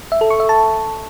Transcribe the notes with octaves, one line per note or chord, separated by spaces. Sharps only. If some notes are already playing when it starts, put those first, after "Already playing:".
E5
A4
C#6
E5
A5